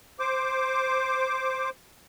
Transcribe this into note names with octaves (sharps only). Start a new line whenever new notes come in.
C5 D6